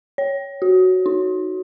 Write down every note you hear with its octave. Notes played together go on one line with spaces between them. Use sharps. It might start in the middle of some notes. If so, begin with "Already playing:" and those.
C#5
F#4
D#4